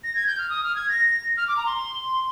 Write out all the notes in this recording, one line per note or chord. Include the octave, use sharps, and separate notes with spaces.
A#6
G#6
G6
F6
D#6
F6
G#6
A#6
F6
D6
A#5
C6